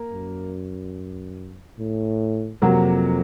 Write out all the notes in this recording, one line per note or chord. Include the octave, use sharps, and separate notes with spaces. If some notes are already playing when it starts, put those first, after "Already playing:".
Already playing: A#3
F#2
A2
F2 C3 F#3 A#3